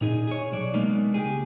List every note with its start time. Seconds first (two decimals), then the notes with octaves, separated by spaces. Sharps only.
0.01 A#2 D#4 G#4
0.28 G#4 C#5
0.52 B1 F#3 D5
0.74 G#3 A#3 B3 D4 D#4
1.14 C#2 G4 G#4